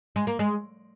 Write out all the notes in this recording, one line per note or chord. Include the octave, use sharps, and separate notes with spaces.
G#3
A#3
G#3